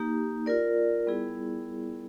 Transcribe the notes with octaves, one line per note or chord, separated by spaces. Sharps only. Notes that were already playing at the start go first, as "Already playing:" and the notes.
Already playing: A#3 D#4 G4
F4 A#4 D5
G3 B3 E4 G#4